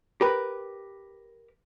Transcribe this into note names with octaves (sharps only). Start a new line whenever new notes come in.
G4 A#4 B4